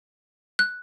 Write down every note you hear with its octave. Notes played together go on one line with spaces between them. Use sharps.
F#6